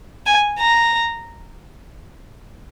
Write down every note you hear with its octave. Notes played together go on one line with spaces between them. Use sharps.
G#5
A#5